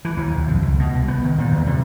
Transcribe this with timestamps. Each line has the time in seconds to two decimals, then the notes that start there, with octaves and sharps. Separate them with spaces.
0.05 E3
0.17 D#2
0.35 B1
0.48 F2
0.62 C#2
0.79 B2
0.95 C2
1.08 B3
1.24 D#3
1.38 A#2
1.51 E2
1.66 C3